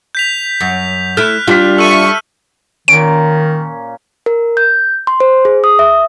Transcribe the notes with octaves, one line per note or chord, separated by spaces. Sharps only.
G6 B6 F7
F#2
A3 E4 F6 F#6
G3 D4 F4 B6
A4 E5 C#6 E6 D#7
A#2 D#3 C#4 D7
A#4
G6
C6
C5
G#4
D#6
E5